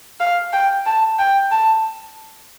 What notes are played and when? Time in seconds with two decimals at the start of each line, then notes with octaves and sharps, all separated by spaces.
0.20 F5
0.53 G5
0.86 A5
1.19 G5
1.51 A5